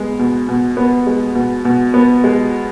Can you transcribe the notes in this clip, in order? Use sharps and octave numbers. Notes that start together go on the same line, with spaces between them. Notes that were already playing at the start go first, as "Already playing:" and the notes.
Already playing: G#3 B3
B2
B2
B3
G#3
B2
B2
B3
G#3